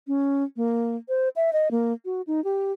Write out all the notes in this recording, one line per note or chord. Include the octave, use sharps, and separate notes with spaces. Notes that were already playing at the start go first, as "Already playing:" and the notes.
C#4
A#3
C5
E5
D#5
A#3
F#4
D#4
G4